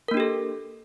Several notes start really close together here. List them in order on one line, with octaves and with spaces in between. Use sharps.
A#4 A#3 D4 G4 A4